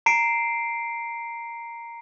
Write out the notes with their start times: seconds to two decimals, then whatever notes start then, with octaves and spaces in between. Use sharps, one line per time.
0.06 A#5 C7 D7